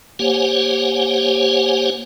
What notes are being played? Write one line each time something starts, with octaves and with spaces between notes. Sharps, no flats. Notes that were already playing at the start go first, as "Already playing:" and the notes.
A#3 G4 C5 C#5 F#5 G#5